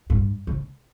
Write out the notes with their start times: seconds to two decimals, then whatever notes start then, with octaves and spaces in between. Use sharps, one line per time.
0.10 G2
0.47 C#3